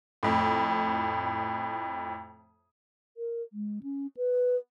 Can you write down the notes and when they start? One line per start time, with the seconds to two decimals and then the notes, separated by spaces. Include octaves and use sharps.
0.23 F2 A2
3.17 A#4
3.53 G#3
3.83 C#4
4.17 B4